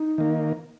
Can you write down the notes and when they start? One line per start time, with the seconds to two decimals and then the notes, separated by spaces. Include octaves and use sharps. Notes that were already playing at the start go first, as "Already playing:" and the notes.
Already playing: D#4
0.18 D#3 A#3